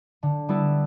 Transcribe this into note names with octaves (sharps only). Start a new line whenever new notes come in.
D3
G3 B3 E4 A4